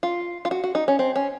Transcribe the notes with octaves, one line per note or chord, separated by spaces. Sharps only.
F4
F4
F#4
F#4
D#4
C#4
C4
C#4